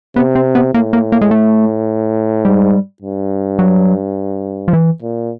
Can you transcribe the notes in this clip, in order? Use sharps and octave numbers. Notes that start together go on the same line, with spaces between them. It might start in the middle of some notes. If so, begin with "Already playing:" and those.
C3 B3
C4
B3
A2 A#3
A#3
A#3
G#3
A3
G#2 G3
G2
F#3
F3
E3
A#2